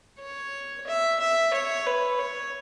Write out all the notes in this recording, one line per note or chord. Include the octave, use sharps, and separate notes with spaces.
C#5
E5
E5
C#5
B4
C#5